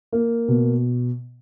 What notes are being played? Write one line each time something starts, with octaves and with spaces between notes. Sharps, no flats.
A#3
B2